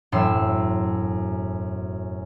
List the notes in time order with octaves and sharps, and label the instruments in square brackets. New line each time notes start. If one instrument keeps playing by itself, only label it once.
[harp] E1 F#2 A2 A4 C6 E6